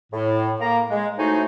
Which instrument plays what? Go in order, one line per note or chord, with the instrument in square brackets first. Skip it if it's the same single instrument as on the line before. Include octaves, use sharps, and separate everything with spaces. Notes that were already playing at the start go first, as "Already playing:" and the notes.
[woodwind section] A2
A#3 A#5
G#3
A2 A3 D#4 F#4 C5 G#5